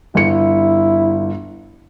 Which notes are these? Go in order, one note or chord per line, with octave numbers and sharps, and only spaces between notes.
G1 E4 C#7